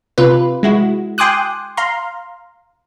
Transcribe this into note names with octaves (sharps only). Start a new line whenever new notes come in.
C3 F4 B4
G#3 E4 F#4
G5 G#5 C6 D6 D#6 F#6
F5 A#5 C6